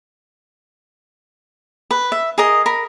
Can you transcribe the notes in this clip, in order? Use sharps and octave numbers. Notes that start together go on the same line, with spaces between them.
B4
E5
G#4 A#4 D#5
A#4 B5